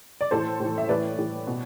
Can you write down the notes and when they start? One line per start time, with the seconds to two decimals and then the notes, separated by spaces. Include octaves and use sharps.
0.21 D5
0.31 A2 E3 A4 C5
0.60 A2 E3
0.78 E5
0.89 A2 E3 B4 D5
1.19 A2 E3
1.47 B2